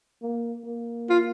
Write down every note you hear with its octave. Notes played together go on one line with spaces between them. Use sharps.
A#3
A#3
F4